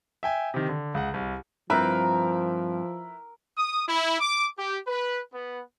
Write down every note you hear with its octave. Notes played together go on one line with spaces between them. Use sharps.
E5 G5 G#5
C3 D#3
D3
C#2 F#5
C2
G2 F3 C4 E4 A#4 B4 E5
D#6
E4
D6
G4
B4
B3